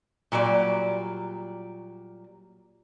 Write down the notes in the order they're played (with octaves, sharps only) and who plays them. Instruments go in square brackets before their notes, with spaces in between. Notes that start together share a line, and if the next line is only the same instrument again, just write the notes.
[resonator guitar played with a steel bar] A#2 F#3 G3 D5